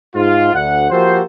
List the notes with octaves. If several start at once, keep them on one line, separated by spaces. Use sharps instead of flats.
G#2 F4
D2 F#5
F3 A#3 F#4 G4 A4 C5